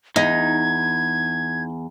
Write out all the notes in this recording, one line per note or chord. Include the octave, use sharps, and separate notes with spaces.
E2 D#4 G#6